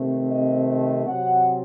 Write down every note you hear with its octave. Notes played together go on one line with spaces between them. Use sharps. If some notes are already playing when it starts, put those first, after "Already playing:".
Already playing: C3 D#3 A3 C4
D#5
D#5
C3 F#3 C4 F#5